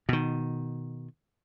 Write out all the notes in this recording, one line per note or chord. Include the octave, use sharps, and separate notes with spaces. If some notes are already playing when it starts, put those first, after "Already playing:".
B2 D#3